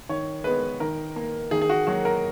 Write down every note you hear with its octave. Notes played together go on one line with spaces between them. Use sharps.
D#3 C#5
G#3 B3 B4
D#3 A#4
A#3
D#3 G#4
G#4
F#4
F#3 A#3 F#4
A#4